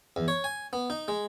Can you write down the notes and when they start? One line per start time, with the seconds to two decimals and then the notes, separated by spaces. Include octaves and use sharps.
0.16 E2
0.28 C#5
0.44 G#5
0.73 B3
0.90 D#4
1.08 G#3